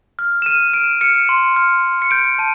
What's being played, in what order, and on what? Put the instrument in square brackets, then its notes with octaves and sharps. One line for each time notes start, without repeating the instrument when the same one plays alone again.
[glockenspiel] F6
E7
F6 D#7
F6 D7
F6 C#7
C6
F6
F6
C#7
G6 D7
A5 D#7